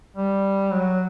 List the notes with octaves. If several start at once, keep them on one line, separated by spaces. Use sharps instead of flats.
G3
F#3